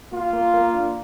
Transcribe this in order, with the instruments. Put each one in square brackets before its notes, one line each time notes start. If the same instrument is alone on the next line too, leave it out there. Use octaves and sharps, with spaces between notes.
[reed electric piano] A#3 [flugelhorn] F4
[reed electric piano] A#3
A#3
D4